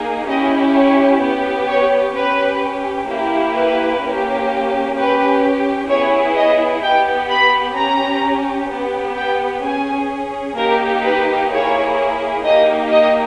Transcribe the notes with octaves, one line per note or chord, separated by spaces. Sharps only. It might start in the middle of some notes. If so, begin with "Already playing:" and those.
Already playing: A#3 D#4 G#4
C#4 E4 G4 D#5
C#5
B3 G4
C#5
C#4 G4 B4
A#3 E4 G4
B4
A#3 C#4 G4
C#4 G4 B4
B3 E4 G#4 C#5
D#5
B3 G4 G5
B5
C#4 G4 A#5
B3 G4
G5
C#4 G#4 G#5
A#3 D#4 G4 A#4
B4
A#3 E4 G#4 C#5
A#3 D#4 G4 D#5
D#5